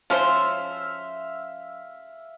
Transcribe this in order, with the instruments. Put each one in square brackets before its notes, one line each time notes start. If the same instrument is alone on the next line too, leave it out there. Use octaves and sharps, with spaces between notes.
[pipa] F3 C#4 C5 [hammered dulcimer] E5 F5